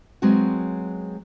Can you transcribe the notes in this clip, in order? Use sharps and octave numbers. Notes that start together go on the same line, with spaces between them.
F#3 G#3 B3 C4 F#4